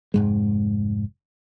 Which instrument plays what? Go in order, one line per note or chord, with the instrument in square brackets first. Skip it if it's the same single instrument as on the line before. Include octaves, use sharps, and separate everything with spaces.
[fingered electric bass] F1 G#2 G#3